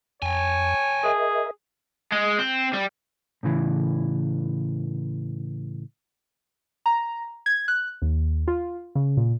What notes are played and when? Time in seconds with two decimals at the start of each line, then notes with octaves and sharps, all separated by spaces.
0.22 F2 C#5 G5 G#5
1.04 G#4 A#4 D#5 E5
2.12 G#3
2.39 C4
2.74 G3
3.43 A2 C#3 E3
6.86 A#5
7.46 G#6
7.68 F#6
8.02 D#2
8.48 F4
8.95 C#3
9.17 A#2